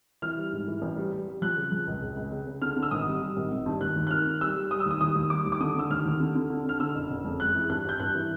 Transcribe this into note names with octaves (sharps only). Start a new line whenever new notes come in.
E3 F6
G3
G#2
E3
A1
G3
G3
G3
F3 F#6
C#3
F3
C#2
C#2
C#2
C#3
C#3
D3 F6
D3
E6
G#1 D#6
G3
G3
G#1
G#1
G2
D#2 F#6
D#2
F#6
D#3 F6
D#3
G3 E6
G3
G3 D#6
E6
D#2
D#6
D#2 D#6
D#2
G3 D6
D#2
D6
D3 D#6
D3 E6
D#2 F6
D#2
D3
D3
D3
D3 F6
D3 E6
F#1
F#1
F2
G#3 F#6
E3
G2 F#6
G2 G6
G2 F#6
E3